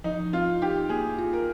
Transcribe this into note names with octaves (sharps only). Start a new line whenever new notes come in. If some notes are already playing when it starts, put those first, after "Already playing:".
F3 D#4
C4 F4
D#4 G4
A#3 G#4
F4
A#4